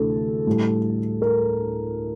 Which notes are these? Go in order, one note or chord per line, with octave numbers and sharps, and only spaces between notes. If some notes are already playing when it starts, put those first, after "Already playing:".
Already playing: D2 C3 E3 A4
A2 G3
A#4